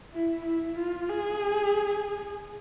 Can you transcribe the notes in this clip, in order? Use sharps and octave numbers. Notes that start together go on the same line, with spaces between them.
E4
E4
F4
G#4